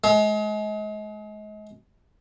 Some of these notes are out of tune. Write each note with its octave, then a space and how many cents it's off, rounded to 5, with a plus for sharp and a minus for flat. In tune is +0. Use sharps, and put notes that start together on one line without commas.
G#3 +35